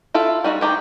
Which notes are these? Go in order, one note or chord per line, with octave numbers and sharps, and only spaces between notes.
E4 F4 A4
G3 D#4 F#4 D#5
D#3 G4 G#4 A#5